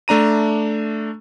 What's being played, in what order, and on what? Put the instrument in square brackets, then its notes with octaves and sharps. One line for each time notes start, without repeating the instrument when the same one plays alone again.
[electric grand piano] A3 D4 A#5 D#7